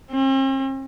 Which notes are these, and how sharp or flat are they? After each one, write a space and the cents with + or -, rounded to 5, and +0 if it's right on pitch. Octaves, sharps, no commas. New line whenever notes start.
C4 +45